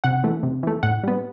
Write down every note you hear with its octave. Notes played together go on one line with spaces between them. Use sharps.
C3 F#5
E3 A3
C3
E3 A3
A2 F#5
G3 B3